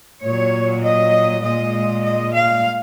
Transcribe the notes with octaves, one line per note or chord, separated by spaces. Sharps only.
A#2 F#3 C#5
D#5
A#2 G#3 D#5
D#5
F5